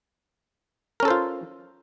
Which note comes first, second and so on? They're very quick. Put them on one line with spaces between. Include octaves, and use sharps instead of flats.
A#4 C#4 A4 C5 F4